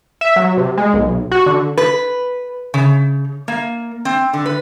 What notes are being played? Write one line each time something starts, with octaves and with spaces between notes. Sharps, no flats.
E5
F#3
C3
G#3
B1
F#4
D3
B4
C#3
A#3
C4
D3
B4